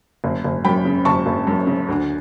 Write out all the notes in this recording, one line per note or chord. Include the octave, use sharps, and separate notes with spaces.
F#1
F#1
F#2 G5 B5
C#3
F#1 A5 C#6
F#1
F#2
C#3
D2